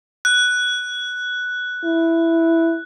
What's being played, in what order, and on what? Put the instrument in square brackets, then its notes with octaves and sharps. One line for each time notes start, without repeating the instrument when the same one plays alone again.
[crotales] F#6
[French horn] E4